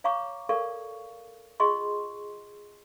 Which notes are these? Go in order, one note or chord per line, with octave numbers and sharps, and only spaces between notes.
C#5 F5 A#5 C#6 D6
A4 A#4 D5 F5 C#6
F4 G#4 D#5 C6 C#6